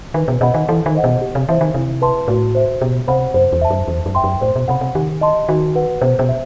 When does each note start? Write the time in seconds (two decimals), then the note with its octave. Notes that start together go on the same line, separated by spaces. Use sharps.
0.14 D#3 B4
0.28 B2
0.41 B2 D#5 F#5 B5
0.54 D#3
0.68 E3 A4
0.86 D#3
0.95 C5 D#5 F#5
1.04 B2
1.21 G4
1.35 C3
1.49 E3 C5 E5
1.61 D#3
1.74 C3 E4
2.02 B4 E5 A5 C6
2.28 A2 F#4
2.55 C5 E5
2.81 B2 G4
3.08 C3 C5 F#5 B5
3.34 F#2 C5
3.52 E2
3.62 E5 A5
3.70 F#2
3.88 E2 C5
4.06 F#2
4.15 E5 G5 C6
4.24 F#2
4.41 A2 C5
4.56 B2
4.68 C3 F#5 B5
4.81 C3
4.95 D#3 G4
5.21 D#5 A5 C6
5.49 D#3 F#4
5.75 B4 F#5
6.01 B2 C5
6.19 B2
6.29 E5